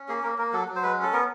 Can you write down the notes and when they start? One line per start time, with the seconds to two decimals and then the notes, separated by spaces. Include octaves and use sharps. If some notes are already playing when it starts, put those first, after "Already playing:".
Already playing: C#4
0.08 A#3 G#4
0.23 A#3 A#4
0.38 A#3 A#4
0.52 F#3 A4
0.68 F#3
0.76 C5
0.83 G#3 B4
0.98 C#4 A4
1.13 B3 A#4